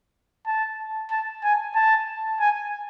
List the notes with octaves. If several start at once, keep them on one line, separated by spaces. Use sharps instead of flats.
A5
A5
G#5
A5
G#5